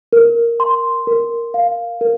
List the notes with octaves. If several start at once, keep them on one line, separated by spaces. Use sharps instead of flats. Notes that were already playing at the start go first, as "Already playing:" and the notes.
A#4
C6
A#4
F5
A#4